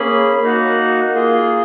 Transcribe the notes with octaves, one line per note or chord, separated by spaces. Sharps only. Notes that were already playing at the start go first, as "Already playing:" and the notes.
Already playing: A#3 C#4 G#4 B5
A#3 D#4 F#4
A#3 F4 G#4